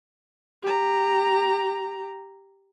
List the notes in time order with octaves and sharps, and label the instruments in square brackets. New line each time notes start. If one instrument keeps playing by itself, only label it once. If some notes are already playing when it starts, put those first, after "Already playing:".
[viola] G4 A#5